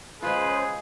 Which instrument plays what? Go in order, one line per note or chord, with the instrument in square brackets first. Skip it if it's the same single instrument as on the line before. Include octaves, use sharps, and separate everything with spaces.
[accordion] C#3 C5 [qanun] G#3 F4 [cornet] G#4 [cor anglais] B4